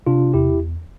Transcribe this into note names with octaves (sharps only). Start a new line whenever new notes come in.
C3 D4 F4
E2 E4 G4